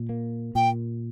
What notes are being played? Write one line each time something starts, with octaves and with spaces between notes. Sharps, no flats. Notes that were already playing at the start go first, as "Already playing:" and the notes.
Already playing: A#2
A#3
A#2 G5